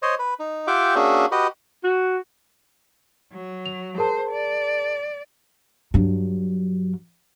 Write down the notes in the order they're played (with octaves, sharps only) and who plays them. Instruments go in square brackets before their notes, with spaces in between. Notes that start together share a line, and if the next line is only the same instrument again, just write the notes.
[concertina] C5 C#5 D#5
B4
D#4
F4 G4 E5 F#5 G5 D6
A#3 C#4 D4 F#4 G#4 E5
F#4 G4 B4 D#5
[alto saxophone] F#4
[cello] F#3
[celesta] F7
[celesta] G#4 A#4 A5 [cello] C5
[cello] D5
[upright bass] G2 F#3